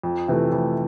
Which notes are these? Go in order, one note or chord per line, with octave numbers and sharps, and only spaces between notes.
F2
C3 E3 A3
F2